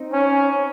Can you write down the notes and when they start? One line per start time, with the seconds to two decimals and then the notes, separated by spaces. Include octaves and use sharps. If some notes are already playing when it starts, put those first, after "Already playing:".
Already playing: C4 D#4
0.12 C#4